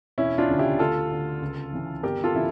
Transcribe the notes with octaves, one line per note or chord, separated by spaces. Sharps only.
E1 C#4 E4
D4 F4
D2 C#3
E4 G4
D2 F4 A4
D3
C#2
C#3 E3
G1 G4 A#4
F4 A4
C#3 E3 E4